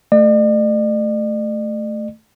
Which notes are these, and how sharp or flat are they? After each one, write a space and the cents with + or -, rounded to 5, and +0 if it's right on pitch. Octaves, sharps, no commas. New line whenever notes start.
A3 +0 D5 +45